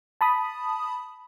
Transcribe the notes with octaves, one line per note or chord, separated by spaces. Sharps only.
A5 B5 D#6